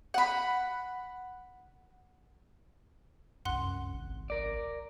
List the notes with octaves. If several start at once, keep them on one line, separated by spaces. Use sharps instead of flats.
F#5 B5
F1 C2 F#2 F#5 C6 F#6
G#1
A#4 D5